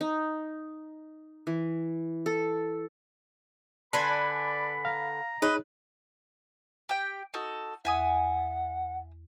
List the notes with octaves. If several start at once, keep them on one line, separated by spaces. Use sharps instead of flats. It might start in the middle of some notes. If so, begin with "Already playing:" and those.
D#4
E3
A4
D3 B4 G#5 A5 B5 C6
D5
F5 A#5
D#4 G#4 B4 C#5 D#5
G4 G5
D#4 F#4 A4
E2 E5 F#5 G#5 D#6